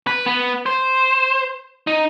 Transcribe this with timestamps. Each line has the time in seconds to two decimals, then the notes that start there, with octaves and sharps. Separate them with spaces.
0.07 B4
0.26 B3
0.66 C5
1.87 D#4